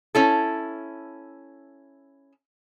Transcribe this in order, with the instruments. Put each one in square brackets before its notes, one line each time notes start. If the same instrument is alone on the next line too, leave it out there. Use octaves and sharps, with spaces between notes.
[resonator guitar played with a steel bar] C#4 E4 A4